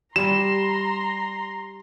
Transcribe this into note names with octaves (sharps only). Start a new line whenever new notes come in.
G3 A#5 C6 E7